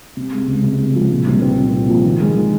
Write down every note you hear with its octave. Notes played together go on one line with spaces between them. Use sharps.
C3
G#3
C#2
C3
G#3
F3
A#2
C2
C4
A#2
A#2
F3
D#3
G#3
D#3